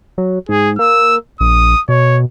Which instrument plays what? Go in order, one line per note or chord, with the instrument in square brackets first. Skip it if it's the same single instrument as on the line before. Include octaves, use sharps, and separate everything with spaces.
[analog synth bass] F#3
[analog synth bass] G#2 [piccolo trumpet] G#4
[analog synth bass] A#3 [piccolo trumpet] E6
[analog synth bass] A#1 [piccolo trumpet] D#6
[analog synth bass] B2 [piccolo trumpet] C#5